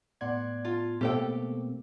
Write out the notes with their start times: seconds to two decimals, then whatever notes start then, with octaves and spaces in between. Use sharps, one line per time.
0.21 A2 B3 D5 F#5 C6 G#6
0.65 F4 A5
1.01 B2 A3 A#3 C4 G4 A4 G5